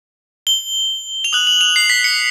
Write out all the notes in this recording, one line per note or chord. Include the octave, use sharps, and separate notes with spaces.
G7
F7
D#6 F#6 F#7
F#7
F7
C7
B6
C#7